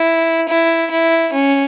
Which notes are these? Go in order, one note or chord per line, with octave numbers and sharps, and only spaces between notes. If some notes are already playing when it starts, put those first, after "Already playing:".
Already playing: E4
E4
E4
C#4